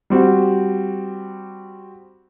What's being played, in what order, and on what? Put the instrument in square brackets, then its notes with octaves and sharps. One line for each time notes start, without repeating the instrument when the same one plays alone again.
[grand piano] G3 C4 F#4